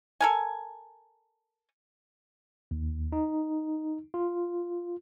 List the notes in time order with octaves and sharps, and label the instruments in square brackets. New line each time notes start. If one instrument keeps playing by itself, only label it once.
[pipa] A4 A#4 G#5
[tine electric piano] D#2
D#4
F4